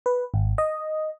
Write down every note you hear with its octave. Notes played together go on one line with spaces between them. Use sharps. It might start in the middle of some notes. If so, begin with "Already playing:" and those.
B4
G#1
D#5